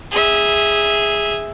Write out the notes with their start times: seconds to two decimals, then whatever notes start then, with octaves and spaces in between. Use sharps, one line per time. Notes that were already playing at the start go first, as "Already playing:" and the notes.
0.12 G#4 E5